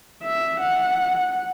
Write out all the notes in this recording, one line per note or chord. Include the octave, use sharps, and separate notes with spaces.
E5
F#5